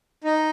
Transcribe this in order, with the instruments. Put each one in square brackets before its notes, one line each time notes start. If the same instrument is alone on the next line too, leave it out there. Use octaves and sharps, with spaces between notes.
[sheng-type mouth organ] D#4